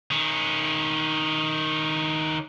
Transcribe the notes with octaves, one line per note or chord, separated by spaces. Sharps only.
D#3 C#4